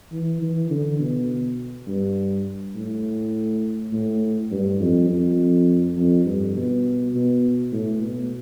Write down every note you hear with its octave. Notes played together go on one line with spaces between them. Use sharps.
E3
E3
D3
B2
G2
A2
A2
G2
F2
F2
F2
G2
B2
B2
A2
B2